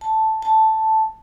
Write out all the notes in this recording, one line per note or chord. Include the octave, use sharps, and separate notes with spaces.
A5
A5